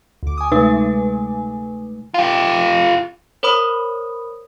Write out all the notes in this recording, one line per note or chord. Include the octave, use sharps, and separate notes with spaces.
D2 D6
G#5 D#6
C3 G#3 A3 D#4 B4 G#5
F4 G4
A#4 C5 C#5 B5 D#6